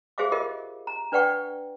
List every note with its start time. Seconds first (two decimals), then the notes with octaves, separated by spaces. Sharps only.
0.18 G4 G#4 C5 E5 F5 D6
0.32 F4 G4 A#4 D#5
0.87 A#5
1.12 D4 B4 D5 F#5 G5 C#6